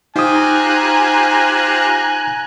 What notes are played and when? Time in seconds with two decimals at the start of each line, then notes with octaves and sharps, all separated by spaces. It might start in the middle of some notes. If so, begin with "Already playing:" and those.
0.16 D#4 F4 G4 C5 G#5 A#5 D#6 F#6